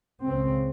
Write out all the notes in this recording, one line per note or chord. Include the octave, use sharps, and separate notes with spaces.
C#2 C#3 C4